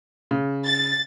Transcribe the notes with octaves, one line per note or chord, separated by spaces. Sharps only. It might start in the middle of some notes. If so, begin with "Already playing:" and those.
C#3
A6